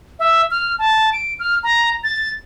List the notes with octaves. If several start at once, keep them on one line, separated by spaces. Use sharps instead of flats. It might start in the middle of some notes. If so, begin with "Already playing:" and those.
E5
F6
A5
D7
F6
A#5
A6